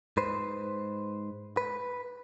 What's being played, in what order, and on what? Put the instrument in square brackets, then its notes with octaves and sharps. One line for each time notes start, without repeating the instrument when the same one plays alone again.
[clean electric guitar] G#2 B4 C5
B4